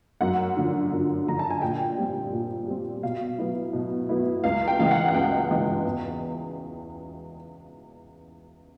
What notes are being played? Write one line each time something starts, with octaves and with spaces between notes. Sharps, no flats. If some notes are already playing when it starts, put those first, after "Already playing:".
F#2 F#5
D3 F3
F#2
D3 F3 A#5
A5
G#5
A#2 G5
G3 C4
A#2
G3 C4
B2 F5
F#3 B3 E4
B2
F#3 B3 E4
C#2 F5
G5
C#3 E3 G#3 F5
F#5
F#5
C#2 G5
C#3 E3 G#3
E2